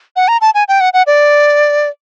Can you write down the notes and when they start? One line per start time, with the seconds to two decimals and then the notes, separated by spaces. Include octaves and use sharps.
0.16 F#5
0.28 A#5
0.41 A5
0.55 G#5
0.68 G5
0.81 F#5
0.93 F#5
1.07 D5